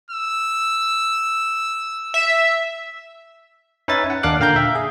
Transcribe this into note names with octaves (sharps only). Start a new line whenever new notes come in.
E6
E5
C#4 D#4 B4 E5 G#5 A6
F#5
D#2 A#3 D4 F5 D6 F#6
A#2 D3 F5 G5 A#5 G6
E5
G#4